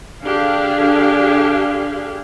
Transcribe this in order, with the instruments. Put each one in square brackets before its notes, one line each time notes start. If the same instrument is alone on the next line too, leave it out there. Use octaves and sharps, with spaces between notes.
[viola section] D3 D4 G4 G#4 F5